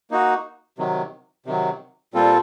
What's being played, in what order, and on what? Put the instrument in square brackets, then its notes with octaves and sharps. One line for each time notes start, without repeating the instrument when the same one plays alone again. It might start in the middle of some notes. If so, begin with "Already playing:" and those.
[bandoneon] A#3 D#4 F#4
C3 D#3 F#3
C3 D#3 F#3
A#2 G3 C4 F4 A4